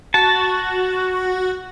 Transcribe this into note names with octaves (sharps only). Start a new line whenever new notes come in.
F#4 A5